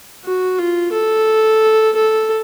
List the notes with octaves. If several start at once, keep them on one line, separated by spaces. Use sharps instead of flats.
F#4
F4
A4
A4